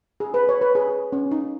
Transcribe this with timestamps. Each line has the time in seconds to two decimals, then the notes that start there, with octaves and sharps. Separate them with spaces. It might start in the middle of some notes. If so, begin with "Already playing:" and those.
0.20 G#4
0.34 B4
0.49 C#5
0.61 B4
0.75 G#4
1.12 C#4
1.31 D#4